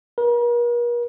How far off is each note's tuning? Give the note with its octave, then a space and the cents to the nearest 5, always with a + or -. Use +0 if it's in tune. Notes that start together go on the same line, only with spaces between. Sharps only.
A#4 +45